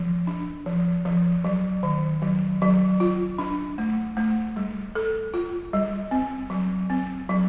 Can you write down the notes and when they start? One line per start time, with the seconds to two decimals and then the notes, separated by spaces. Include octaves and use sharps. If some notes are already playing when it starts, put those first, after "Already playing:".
Already playing: F3
0.27 D4
0.66 F3
1.05 F3
1.45 F#3
1.83 D#3
2.22 F#3
2.62 F#3
3.00 F4
3.38 D4
3.78 A3
4.17 A3
4.56 G3
4.95 A4
5.34 F4
5.73 G3
6.11 C4
6.50 F#3
6.90 C4
7.29 F#3